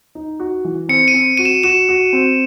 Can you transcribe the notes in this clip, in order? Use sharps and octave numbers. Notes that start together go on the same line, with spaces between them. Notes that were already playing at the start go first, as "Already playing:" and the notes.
D#4
F#4
E3
C4 C#7
D#7
C4
F#4 D#7
E7
F#4 E7
F#4
C4